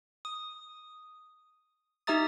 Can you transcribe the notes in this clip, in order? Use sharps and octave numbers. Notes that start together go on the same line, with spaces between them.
D#6
D#4 G4 E5 A#5 D#6 A6